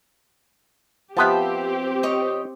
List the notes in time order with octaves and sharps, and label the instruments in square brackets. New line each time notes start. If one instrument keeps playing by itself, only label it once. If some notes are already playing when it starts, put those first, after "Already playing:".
[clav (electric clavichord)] F3 B3 B4 [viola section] C4 G4 [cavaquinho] E5 G5 A5
[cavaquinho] C#5 D#5